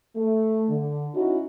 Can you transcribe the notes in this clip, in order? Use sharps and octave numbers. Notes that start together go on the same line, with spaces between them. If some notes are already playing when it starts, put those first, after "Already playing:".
A3
D3
C#4 D#4 E4 F#4